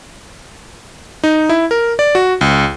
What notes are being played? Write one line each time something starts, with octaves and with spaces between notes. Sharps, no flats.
D#4
E4
A#4
D5
F#4
C#2